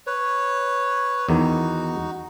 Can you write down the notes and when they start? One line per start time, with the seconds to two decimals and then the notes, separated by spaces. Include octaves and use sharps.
0.07 B4 C#5
1.29 E2 D#3 D#4 F#4